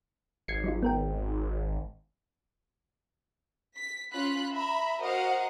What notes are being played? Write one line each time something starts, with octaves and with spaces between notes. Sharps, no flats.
G#1 G#6 C7 C#7
F#3 D#4 F4
B3 A#4 G5
B6
C#4 F4 F5 B5 F#6 B6
E5 A#5 B5
F#4 A#4 C5 D#5 F5 F#5